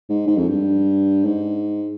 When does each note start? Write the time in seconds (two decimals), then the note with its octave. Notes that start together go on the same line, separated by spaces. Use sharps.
0.09 G#2
0.27 G#2
0.38 F2
0.48 G2
1.24 G#2